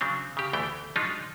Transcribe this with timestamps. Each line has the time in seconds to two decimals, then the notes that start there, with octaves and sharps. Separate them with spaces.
0.01 C#3 F#3 C4 D4
0.37 C#3 G4
0.53 D2 E3 A3 G5
0.96 F3 F#3 G#3 D4 D#4 F4